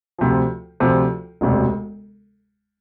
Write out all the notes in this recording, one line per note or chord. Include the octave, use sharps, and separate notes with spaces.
D2 C3 F3
D2 C3 F3
E1 D2 C3